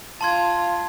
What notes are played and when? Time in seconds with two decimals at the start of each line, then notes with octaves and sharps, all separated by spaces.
0.21 F4 A5 C6 G#6